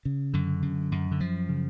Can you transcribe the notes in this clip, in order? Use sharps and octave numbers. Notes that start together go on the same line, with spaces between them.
C#3
F#2 D3
F#2
F#2
D3
F#2 F3
C#3